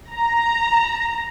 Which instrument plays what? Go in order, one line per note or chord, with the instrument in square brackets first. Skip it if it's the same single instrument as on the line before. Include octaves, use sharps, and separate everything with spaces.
[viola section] A#5